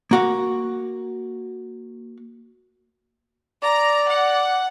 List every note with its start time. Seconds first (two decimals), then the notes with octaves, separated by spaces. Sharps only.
0.11 A#3 F#4 F5
3.63 D5 A#5
4.08 F#5